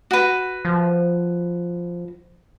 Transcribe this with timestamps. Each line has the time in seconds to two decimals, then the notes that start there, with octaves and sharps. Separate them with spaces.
0.11 F#4 B4
0.65 F3